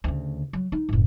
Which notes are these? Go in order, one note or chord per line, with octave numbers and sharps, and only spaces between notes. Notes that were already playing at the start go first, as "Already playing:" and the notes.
D2 C#3
F#3
D#4
F#1 A2